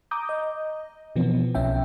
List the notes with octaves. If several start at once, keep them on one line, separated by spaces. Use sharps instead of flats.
A#5 D6 D#6 G6
D#5
B2 E3 F3 B3 C4
B1 B2 C#4 E5 G5